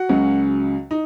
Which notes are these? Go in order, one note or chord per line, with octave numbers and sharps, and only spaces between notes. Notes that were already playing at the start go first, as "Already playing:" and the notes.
Already playing: F#4 F#5
C#2 C#3 F#3 C#4
D#4